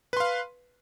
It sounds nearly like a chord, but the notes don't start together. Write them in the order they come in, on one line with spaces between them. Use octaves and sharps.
B4 C6 F5